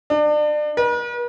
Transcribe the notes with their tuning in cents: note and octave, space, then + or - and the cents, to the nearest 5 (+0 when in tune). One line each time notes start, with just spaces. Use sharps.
D4 +35
B4 -45